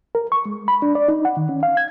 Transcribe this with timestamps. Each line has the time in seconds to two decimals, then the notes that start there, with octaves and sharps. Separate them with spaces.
0.15 A#4
0.32 C#6
0.45 G#3
0.68 B5
0.82 D4
0.95 D5
1.08 D#4
1.25 F#5
1.37 D#3
1.49 C#4
1.63 F5
1.77 G#6